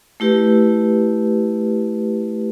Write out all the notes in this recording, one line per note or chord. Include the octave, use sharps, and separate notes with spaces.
A3 E4 G4 B4